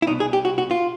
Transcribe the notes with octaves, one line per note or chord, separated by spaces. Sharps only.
E4
C2 B2 D#4
G#4
G4
F#4
F#4
F4